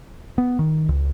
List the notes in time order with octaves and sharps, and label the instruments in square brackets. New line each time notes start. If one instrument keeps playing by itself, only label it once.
[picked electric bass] B3
D#3
C#2